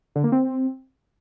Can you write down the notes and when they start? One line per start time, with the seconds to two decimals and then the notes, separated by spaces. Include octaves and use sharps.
0.15 D3
0.24 A#3
0.32 C4